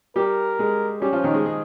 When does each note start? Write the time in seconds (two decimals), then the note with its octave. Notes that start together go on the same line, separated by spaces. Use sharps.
0.16 G3 G4 A#4
0.59 G#3 G#4
1.02 G3 C#4 G4
1.13 F3 F4
1.24 D#3 D#4
1.34 G#3 G#4
1.45 G#3 G#4